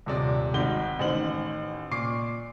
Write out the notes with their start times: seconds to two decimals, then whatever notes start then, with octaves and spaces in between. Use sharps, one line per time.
0.06 D#1 C3 D5
0.54 G#1 C4 D#4 F#4 G7
0.99 A1 D#3 C5 F#7
1.91 A#2 C#6 D6 C7